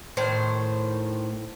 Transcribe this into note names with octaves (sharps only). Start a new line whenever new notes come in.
A2 D#3 C5